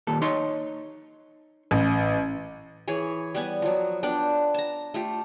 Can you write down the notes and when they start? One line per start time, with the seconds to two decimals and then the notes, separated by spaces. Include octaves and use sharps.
0.07 D#2 A#2 A4
0.22 D#4 C#5 C6
1.71 A1
2.88 E3 G#4 C#5
3.35 G3 B3 G#5
3.62 F3 F#3
4.03 B3 D4 G5
4.54 A5 A#5
4.94 A3 F4 G4